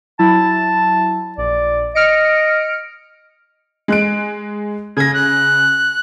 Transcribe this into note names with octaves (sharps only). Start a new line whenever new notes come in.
F#3 E4 A5
A#1 D5
D#5 F6 C#7 D7
G#3 F#6 D7
C#3 G#6 A#6
F#6